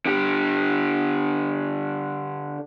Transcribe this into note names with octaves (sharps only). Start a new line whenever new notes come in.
D3 G4